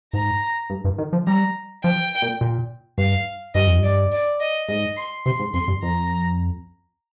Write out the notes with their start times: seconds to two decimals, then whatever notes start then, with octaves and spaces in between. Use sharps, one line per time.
0.13 G#2 A#5
0.70 G2
0.84 G2
0.98 D#3
1.13 F3
1.27 G3 A#5
1.84 F3 G5
2.22 A#2
2.41 A#2
2.98 G2 F5
3.54 G2 D#5
3.67 F2
3.79 G2 D5
4.12 D5
4.40 D#5
4.68 G#2 D#5
4.96 C6
5.26 C3 C6
5.39 G#2
5.54 F2 C6
5.68 G2
5.82 F2 A#5